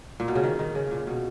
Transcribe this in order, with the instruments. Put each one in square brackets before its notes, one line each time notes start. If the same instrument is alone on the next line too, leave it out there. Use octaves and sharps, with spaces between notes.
[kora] A#2
B2
C#3
D#3
D#3
C#3
A#2
B2